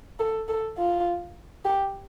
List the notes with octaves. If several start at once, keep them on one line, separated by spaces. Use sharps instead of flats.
A4
A4
F4
G4